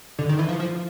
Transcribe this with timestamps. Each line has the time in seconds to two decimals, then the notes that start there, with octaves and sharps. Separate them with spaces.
0.19 D3
0.29 D#3
0.39 E3
0.49 F3
0.60 F3